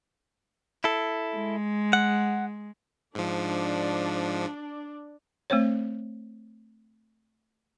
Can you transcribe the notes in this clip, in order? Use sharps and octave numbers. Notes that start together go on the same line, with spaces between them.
E4 A4
G#3
F#5
G#2 F3 D4 D5
A3 C4 C5 C#5